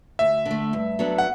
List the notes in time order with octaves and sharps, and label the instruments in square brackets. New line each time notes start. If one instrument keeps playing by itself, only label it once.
[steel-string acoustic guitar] D2 [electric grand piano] E5
[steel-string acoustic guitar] D3
A3
G2
F#3 B3 D4 A4
[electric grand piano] F#5